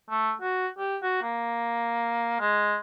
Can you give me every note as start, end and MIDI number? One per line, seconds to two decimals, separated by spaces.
0.09 0.32 57
0.42 0.67 66
0.78 0.97 67
1.02 1.21 66
1.22 2.38 58
2.40 2.77 56